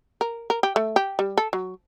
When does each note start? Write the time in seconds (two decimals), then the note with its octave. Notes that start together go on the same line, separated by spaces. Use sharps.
0.21 A#4
0.50 A#4
0.63 G4
0.76 A3
0.96 G4
1.19 G3
1.37 A4
1.53 F#3